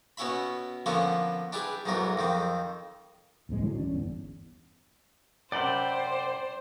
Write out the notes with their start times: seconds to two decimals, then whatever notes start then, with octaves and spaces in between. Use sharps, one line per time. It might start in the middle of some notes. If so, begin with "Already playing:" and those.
0.17 B2 B3 C#4 E4 E5 B5
0.86 D3 F3 A#3 B3 C#4 E4
1.53 D4 E4 G4 G#4 B4
1.85 B1 E2 G#2 B2 F#3 A#4
2.17 F2 D#3 C4
3.49 D1 A#1 F2 G#3
3.62 A1 D3 E3 F#3
3.78 D#1 C#4 D4
3.92 G1 E2
5.52 F#2 C3 C5 D5 G5 B5